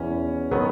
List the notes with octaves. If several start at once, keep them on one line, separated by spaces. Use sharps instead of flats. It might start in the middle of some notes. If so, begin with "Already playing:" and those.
Already playing: E2 B2 C#4
D#3 F#3 B3